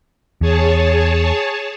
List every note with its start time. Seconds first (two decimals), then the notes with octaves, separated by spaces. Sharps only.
0.41 E2 G#4 C#5 A5